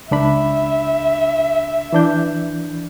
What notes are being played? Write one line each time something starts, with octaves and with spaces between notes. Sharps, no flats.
C#2 D4 E5 B5
E3 D4 G6